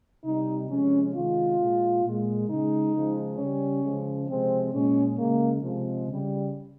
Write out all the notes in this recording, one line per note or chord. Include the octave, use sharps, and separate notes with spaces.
C3 G3 D#4
C3 F3 G#3 C#4
C3 D#3 G#3 F4
A#2 G#3
A#2 G#3
C#3 G#3 D#4
C#3 F3 G#3
C#3 C#4
G3
C#3 F3 G#3
C3 F3 G#3 C4
A#2 G#3 C#4
C#3 G#3 A#3
C3 F3 G#3
C#3 G3